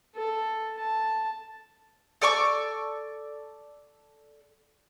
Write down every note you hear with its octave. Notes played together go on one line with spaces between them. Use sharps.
A4
A5
A4 D5 C#6 D6